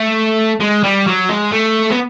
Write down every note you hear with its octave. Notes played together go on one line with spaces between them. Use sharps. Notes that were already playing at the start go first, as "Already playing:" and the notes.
Already playing: A3
G#3
G3
F#3
G#3
A3
B3